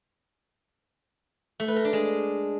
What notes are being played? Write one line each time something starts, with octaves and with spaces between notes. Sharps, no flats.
A3
B4
A#4
D4
G#3